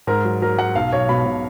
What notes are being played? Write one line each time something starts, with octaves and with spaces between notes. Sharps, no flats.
G#2 A#4
F#3
F#3 A#4
F#3 F#5
B1 F5
B1 C#5
B2 B5
B2